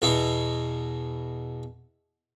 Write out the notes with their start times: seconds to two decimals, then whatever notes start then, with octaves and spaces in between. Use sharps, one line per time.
0.02 E2 B2 E4